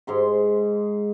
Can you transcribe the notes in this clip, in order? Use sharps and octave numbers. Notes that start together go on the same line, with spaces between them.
G#2 G#3 C6